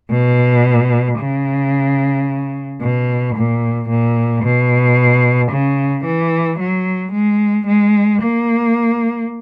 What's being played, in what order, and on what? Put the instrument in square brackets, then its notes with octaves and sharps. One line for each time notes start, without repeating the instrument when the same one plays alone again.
[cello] B2
C#3
B2
A#2
A#2
B2
C#3
E3
F#3
G#3
G#3
A#3